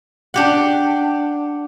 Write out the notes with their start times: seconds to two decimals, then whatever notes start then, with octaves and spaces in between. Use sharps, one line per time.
0.34 D4 G4 F#5